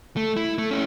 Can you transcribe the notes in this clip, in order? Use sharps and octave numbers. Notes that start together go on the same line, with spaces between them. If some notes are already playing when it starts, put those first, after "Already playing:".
A3
E4
A3
C#4 E4